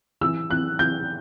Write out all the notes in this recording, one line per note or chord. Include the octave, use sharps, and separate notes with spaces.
E3 E6
E3 F#6
E3 G6